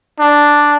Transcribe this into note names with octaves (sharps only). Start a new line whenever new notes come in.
D4